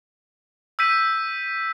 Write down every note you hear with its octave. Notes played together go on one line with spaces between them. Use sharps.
E6 G6 B6 D#7